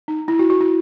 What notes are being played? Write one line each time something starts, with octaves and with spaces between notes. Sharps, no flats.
D#4
E4
F#4
F#4
E4